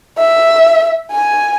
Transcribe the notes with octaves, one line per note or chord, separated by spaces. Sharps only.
E5
G#5